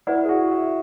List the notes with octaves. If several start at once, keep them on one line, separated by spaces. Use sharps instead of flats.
E4 B4 D5 F#5
G#4
F#4
E5